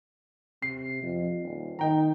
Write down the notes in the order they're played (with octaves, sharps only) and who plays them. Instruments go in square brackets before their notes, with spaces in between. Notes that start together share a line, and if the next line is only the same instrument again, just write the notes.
[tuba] C3 [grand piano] C7
[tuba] F2
D#1
[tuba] D#3 [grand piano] D#4 G5 A#5